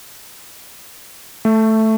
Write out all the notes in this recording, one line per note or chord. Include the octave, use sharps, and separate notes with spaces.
A3